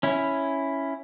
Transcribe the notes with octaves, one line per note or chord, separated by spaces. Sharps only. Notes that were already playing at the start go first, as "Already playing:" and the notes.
C#4 E4